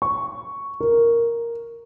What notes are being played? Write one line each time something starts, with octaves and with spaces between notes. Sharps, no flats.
C#6
A#4